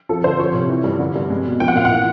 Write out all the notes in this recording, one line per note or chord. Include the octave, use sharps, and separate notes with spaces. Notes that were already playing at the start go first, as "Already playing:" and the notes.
F3 A4
D3 C5
F3 C#5
C3
E3
G2
D3
G2
G#3
B2
F3 G5
F#5
A#2 F5
F#5
E3